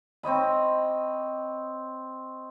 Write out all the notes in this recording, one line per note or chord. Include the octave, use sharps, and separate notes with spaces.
C4 C#5 D#5 B5